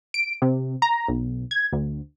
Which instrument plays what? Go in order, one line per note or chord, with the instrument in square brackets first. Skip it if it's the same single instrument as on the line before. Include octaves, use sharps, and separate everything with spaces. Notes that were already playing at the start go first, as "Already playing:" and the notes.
[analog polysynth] D7
C3
A#5
B1
G#6
D2